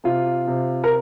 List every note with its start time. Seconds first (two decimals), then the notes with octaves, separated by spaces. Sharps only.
0.04 C3 F4
0.47 C3
0.84 A#4